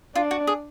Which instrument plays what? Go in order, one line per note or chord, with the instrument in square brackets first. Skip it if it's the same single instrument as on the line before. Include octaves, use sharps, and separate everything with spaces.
[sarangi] D4 [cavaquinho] F4
[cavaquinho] F#4
G#4